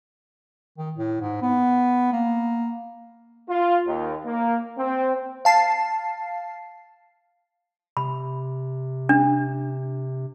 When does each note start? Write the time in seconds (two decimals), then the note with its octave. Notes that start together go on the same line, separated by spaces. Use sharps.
0.78 D#3
0.98 A2
1.21 G#2
1.42 B3
2.12 A#3
3.49 F4
3.86 D#2
4.25 A#3
4.77 C4
5.45 F5 A5 C7
7.97 C3 B5
9.09 D4